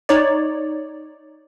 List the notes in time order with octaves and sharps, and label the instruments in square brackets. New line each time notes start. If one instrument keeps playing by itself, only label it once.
[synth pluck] D#4 C#5 D5